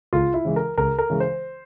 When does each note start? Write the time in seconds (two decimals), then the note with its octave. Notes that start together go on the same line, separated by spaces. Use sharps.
0.13 C#2 F4
0.34 E4
0.45 C#3 E3 G#3
0.56 A#4
0.78 C#2 A#4
0.98 A#4
1.10 C#3 E3 G#3
1.20 C5